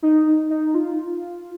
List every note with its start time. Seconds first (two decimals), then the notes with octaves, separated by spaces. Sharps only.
0.02 D#4
0.50 D#4
0.74 F4